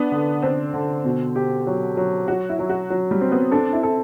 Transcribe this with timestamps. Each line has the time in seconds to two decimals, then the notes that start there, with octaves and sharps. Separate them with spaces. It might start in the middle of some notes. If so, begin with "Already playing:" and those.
Already playing: B3 D4
0.12 D3
0.42 C4 D4
0.74 D3
1.05 B2
1.36 G4
1.67 F#3
1.97 F#3
2.28 F#3 F#4
2.49 E4
2.59 F#3
2.70 F#4
2.90 F#3
3.11 G3
3.21 C4
3.32 B3
3.52 D4 A4
3.73 E4
3.83 A4